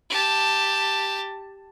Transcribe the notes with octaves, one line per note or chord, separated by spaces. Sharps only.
G4 A5